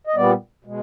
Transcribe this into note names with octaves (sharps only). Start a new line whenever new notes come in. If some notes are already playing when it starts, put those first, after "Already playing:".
D#5
A#2 G3 B3 D5
B2 G#3